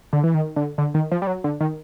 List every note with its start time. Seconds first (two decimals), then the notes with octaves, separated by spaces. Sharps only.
0.13 D3
0.24 E3
0.34 D#3
0.56 D3
0.78 D3
0.94 D#3
1.12 F3
1.22 G3
1.27 F#3
1.44 D3
1.60 D#3